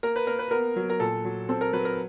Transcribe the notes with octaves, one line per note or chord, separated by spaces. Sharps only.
A#3 A#4
B4
A#3 A#4
B4
B3 A#4
F#3
A#4
A#2 A4
F#3
C4 A4
A#4
F#3 B4
A#4